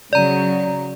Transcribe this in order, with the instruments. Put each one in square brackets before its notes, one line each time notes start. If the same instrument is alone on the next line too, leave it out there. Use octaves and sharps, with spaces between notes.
[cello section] C#3 F#3 [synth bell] D5 A#5